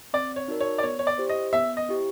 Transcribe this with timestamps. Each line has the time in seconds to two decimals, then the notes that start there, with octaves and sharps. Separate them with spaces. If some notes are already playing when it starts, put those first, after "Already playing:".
0.13 C4 D5
0.36 C#5
0.48 D#4 F#4 A#4 D5
0.60 C#5
0.78 D5
0.83 B3 C#5
0.99 C#5
1.07 D5
1.18 E4 G4 C5
1.29 D#5
1.53 B3 E5
1.77 D#5
1.89 E4 G4 C5